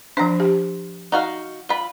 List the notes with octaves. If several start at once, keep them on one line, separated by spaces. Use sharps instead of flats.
F3 D4 C5 A#5
G4
D#4 F#4 F5
F4 B5